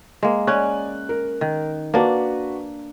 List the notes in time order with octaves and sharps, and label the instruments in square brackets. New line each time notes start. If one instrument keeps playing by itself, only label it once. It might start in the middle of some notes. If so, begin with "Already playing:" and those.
[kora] G#3 A#3
[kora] C#4 [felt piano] D5 G#5 F#6
[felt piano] A#4
[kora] D#3
[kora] A#3 D4 [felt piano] F#4 B4